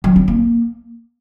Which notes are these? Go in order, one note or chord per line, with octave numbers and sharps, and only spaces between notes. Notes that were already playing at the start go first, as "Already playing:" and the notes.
F#3
C4
A#3